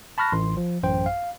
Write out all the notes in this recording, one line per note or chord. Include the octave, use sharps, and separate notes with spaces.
A5 B5 C#6 F6 F#6 A#6
A1 C6
F3
A1 F#2 C5 G5
F5